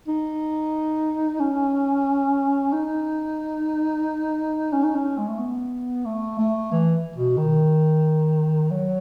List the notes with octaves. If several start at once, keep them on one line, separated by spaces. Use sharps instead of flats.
D#4
C#4
D#4
C#4
D#4
C#4
G#3
A3
B3
A3
A3
E3
B2
D#3
F#3